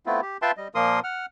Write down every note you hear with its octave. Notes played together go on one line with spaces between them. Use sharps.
A3 B3 C4 E4 F4
G4
F4 B4 E5 G5 A5 C6
G3 D#5
A#2 F3 A#3 A#4 C6 D#6
F#5 F6